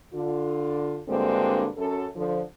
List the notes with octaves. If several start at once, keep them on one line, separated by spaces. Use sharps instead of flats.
D3 F4
G2 D3 G#3 A#3 C4 F#4
F#2 A4
D3 F3